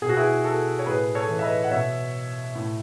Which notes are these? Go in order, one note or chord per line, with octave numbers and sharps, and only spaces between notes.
B2 G#4
F#4
E4 G#4
F#4 A4
C#5
A2 G#4 B4
A4 C#5
E3
E5
B4 D#5
F#5
B2 C#5 E5
A2